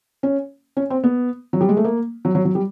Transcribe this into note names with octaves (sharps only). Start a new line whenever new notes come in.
C#4
C#4
C4
B3
F#3
G3
G#3
A3
A#3
F#3
F#3
F#3
G3